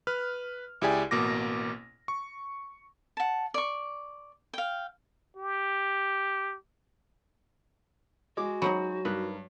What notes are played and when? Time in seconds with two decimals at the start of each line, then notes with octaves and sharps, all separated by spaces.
0.07 B4 F6
0.81 C#2 E4 G4 G#4 D5 G#5
1.11 A1 B2 A#3 D6 A#6
2.08 C#6
3.17 F#5 A5
3.54 D5 C#6
4.53 F5 G5
5.37 G4
8.37 G#3 F#4 D6
8.62 F#3 D#4 C5 B5
9.05 G2 D#4 A#4 B4